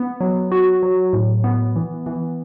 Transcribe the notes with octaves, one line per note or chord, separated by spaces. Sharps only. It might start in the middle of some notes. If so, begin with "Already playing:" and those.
Already playing: B3
F#3
F#4
F#3
A2
B3
E3
E3